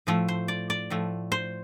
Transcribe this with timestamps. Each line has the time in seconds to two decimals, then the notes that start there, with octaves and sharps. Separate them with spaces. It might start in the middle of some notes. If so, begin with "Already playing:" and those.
0.07 A2 F3 A3
0.28 C5
0.48 D5
0.70 D5
0.90 A2 F3 A3
1.32 C5